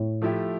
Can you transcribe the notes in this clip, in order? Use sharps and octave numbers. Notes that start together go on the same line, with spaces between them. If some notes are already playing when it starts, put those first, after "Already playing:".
Already playing: A2
F3 A3 E4 G4